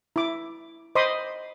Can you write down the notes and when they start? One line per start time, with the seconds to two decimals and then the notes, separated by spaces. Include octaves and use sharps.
0.16 E4 D6
0.95 C5 D#5 B5 C6 D6 D#6